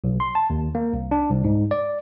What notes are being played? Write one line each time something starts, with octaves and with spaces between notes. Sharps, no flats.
B1
C6
A5
D#2
A#3
C2
D4
C2
G#2
D5